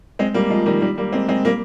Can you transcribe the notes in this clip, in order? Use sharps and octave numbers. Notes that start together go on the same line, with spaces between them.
G#3 C4
G3 A#3
F3 G#3
D#3 G3
D#3 G3
G3 A#3
G#3 C4
G#3 C4
G3 A#3